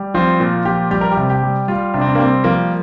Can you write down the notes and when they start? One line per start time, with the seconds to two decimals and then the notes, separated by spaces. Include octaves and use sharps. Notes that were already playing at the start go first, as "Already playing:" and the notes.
Already playing: G3
0.14 F3 C4
0.40 A#2
0.65 F3 G4
0.91 G3 G4
1.01 A#4
1.11 G4
1.17 C3
1.30 G4
1.43 G3
1.68 G3 F4
1.94 C3 D4
2.01 C4
2.09 D4
2.15 A#3
2.19 G3 C4
2.44 F3 A#3